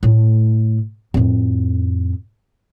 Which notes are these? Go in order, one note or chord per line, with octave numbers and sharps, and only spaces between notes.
A2 A3
F2 A2